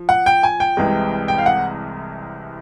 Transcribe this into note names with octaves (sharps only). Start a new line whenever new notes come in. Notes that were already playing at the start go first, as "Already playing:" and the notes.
Already playing: F3
F#5
G5
G#5
G5
C2 C3 E3 G#3
G5
F5
F#5